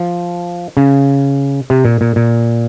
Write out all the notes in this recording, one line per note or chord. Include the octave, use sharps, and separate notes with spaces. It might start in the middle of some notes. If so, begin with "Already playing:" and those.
Already playing: F3
C#3
C3
A#2
A#2
A#2